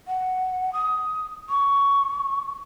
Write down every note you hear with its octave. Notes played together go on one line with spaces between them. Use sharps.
F#5
D#6
C#6